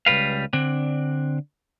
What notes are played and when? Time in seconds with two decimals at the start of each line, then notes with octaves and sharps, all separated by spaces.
0.06 C#2 C3 G3 B4 F5
0.53 D3 C4 D4